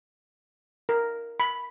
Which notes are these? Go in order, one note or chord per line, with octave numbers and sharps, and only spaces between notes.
A#4
B5